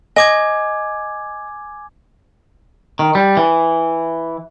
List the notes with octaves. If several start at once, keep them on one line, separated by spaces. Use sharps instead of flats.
D#5 G#5 D6 G#6
D#3
G3
E3